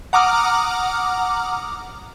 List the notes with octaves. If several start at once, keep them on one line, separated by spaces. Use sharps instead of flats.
F#5 A#5 D6 D#6 F6